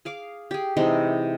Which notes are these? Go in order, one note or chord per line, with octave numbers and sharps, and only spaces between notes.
G#4 F5 D6
G4 G#4
C3 E3 G#3 D#4